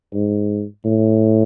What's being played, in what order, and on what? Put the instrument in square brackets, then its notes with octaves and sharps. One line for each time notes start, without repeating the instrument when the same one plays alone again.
[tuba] G#2
A2